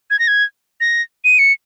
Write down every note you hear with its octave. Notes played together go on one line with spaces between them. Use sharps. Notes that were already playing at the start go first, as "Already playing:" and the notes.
G#6
A#6
G#6
A#6
D#7
C#7